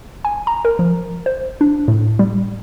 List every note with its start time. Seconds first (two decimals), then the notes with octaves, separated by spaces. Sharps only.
0.25 G#5
0.47 A#5
0.65 A#4
0.79 F3
1.26 C5
1.61 D4
1.88 A2
2.19 G3